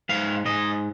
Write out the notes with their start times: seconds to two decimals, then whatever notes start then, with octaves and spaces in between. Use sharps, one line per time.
0.09 G#2 F5
0.45 G#2 D#5